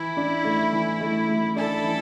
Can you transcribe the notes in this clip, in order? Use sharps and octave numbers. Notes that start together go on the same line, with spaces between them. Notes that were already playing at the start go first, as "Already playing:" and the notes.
Already playing: E3 E4
D4
A3
E3
A3
A3
D4 E4 A4
E3